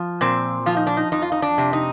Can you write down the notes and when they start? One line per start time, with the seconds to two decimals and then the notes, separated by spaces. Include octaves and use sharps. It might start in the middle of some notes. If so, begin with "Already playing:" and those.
Already playing: F3
0.21 A#2 C4
0.66 F3 F4
0.77 D#4
0.87 D4
0.97 D#4
1.12 F2 D#4
1.22 F4
1.32 D#4
1.42 D4
1.58 C3
1.73 D#4